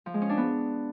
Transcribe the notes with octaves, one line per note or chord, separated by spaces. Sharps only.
F3
G#3
C#4
D4
B3